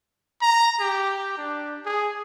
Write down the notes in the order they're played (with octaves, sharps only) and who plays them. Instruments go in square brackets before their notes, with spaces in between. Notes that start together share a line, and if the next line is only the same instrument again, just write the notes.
[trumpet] A#5
G4
D4
G#4